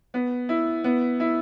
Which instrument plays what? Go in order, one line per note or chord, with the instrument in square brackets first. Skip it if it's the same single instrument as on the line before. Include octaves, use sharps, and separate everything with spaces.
[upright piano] B3
E4
B3
E4